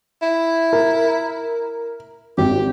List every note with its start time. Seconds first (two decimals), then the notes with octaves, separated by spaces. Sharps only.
0.22 E4
0.73 A#4
2.38 G#1 G4